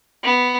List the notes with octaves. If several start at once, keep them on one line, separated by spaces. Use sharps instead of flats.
B3